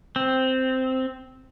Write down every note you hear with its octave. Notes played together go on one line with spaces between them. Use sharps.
C4